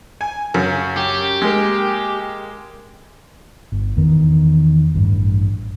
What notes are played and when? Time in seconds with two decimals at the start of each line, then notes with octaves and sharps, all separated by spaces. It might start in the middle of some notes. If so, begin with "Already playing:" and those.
0.21 G#5
0.54 F#2 C#3
0.97 G4
1.42 G#3 A#3
3.72 G1
3.97 E2 D#3
4.94 A1 G2